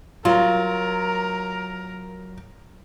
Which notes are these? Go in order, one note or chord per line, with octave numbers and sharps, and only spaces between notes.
F#3 F4 A#4